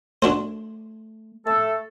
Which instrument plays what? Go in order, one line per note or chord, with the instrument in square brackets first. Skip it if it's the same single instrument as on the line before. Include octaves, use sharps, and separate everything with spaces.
[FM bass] A3 [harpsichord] D4 F#4 C5
[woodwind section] A3 A4